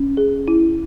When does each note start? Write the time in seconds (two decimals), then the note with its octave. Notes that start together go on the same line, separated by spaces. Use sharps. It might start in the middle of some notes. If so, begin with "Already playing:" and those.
Already playing: C#4
0.17 G#4
0.48 E4